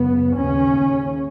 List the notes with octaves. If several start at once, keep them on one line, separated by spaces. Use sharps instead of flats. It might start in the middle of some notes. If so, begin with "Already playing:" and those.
Already playing: F#2 C#3 B3
D#2 C#3 C#4